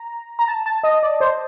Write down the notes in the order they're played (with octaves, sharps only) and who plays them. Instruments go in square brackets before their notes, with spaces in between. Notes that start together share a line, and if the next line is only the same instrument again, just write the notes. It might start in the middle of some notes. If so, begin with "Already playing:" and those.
Already playing: [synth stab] A#5
A#5
A5
A5
D#5
D5
C5